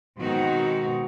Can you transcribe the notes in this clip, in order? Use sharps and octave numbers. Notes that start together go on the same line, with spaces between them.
B2 D#3 G#3 C4 D#4 F#4